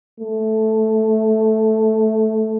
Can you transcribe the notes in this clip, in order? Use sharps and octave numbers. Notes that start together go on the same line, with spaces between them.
A3